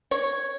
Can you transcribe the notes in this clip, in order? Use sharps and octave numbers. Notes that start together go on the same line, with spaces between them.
C#5